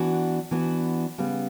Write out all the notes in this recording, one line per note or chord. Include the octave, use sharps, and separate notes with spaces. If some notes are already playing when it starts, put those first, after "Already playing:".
Already playing: E3 B3 D4 F#4
E3 B3 D4 F#4
C#3 G3 B3